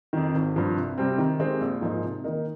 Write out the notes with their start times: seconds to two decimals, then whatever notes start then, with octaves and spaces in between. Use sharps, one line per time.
0.13 F2 D#3
0.34 G#1
0.56 G2 F3
0.77 C2
0.98 C3 G3 C4
1.18 D#3
1.40 G#3 C4 G4 A#4
1.61 A#1
1.81 G#2 F3 A#3 D#4
2.02 C3
2.24 D#3 A#3 D#4 A#4